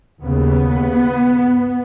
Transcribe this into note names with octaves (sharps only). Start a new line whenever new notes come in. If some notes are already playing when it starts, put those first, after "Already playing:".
D#2 C#3 B3